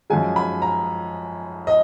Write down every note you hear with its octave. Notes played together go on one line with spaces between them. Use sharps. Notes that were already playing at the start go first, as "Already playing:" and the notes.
F#2 F3 G#3 G#5
B5
A#5
D#5